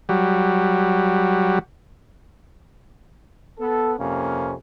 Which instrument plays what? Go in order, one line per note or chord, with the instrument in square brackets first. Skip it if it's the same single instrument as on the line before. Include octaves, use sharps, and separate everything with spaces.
[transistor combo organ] F#3 G3
[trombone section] B3 A4
F2 C3 A#3 C#4